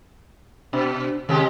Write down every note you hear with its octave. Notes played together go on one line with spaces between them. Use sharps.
B2 D4
C3 D#3 G#3 G4